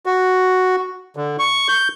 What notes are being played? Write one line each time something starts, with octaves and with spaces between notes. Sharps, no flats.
F#4
D3
C#6
G6